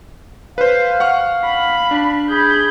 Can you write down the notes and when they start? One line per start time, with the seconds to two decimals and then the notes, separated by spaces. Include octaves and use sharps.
0.58 B4 C5 F5
1.00 F#5 C#6 F6
1.44 B5
1.91 D4
2.30 G#4 B5 G6